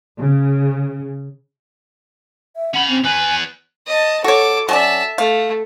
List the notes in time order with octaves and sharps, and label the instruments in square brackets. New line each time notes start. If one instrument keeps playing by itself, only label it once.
[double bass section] C#3
[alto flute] E5
[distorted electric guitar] C#4 B5 [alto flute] F#5
[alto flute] C4
[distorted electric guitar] E2 B4 [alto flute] G#5
[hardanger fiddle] D#5 A5
[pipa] F#4 C#5 [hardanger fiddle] A4 D6
[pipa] F#3 C#4 D5 [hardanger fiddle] E5 A5
[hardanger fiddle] A3 [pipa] F5